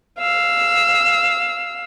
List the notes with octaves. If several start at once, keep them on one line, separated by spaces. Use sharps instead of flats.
F5 E6